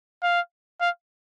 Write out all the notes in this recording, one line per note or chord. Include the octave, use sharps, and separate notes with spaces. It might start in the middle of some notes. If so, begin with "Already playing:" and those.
F5
F5